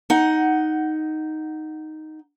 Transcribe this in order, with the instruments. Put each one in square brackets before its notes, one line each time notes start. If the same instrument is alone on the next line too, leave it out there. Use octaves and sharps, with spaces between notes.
[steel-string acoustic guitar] D#4 F#5